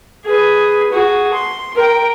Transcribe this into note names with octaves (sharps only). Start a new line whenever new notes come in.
G#4 B4
F#4 G#4
C6
A#4 G5